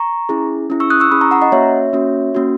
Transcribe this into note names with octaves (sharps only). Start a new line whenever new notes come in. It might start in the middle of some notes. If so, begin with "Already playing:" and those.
Already playing: A#5 C#6
C#4 E4 G#4
C#4 E4 G#4
C#6 E6
D#6 F#6
C#6 E6
C#4 E4 G#4 B5 D#6
A#5 C#6
F#5 A#5
D#5 F#5
A#3 C#4 F#4 C#5 E5
A#3 C#4 F#4
A#3 C#4 F#4